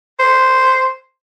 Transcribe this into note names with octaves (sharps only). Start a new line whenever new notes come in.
C5